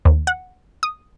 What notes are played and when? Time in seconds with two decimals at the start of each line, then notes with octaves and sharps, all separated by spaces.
0.05 D#2
0.27 F#5
0.83 D#6